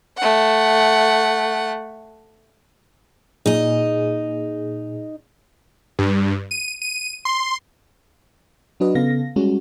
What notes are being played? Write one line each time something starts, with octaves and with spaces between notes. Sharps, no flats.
A3 F#5
A#2 D#4 G#4 D#5
G2
D#7
D#7
C6
F#3 D4 F#4 B4 D#5
C#3 B3 A4 F5 A#6
G3 G#3 C#4 F#4